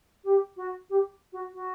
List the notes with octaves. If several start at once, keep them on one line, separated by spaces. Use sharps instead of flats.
G4
F#4
G4
F#4
F#4